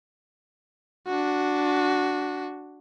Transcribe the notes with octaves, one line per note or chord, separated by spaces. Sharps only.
D4 F#4